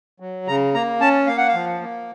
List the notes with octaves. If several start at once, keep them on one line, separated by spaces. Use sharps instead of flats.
F#3
C#3 A#5
A#3 A#5
C#4 A5
A#3 F5
F#5
F5
F3
A#3